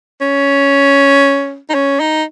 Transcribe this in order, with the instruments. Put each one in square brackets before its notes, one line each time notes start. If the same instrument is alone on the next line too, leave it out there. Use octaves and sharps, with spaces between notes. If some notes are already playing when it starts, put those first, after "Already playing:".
[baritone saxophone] C#4
D#4
C#4
D#4